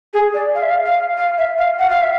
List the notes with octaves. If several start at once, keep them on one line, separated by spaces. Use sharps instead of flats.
G#4
D5
F5
E5
F5
F5
F5
E5
F5
F#5
F5
E5